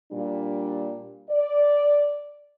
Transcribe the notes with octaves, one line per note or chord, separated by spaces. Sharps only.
A#2 G3 D4
D5